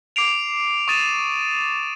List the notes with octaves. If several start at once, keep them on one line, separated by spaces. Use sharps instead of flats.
D6 C7 D7 F7
C#6 D#6 A6 D#7 E7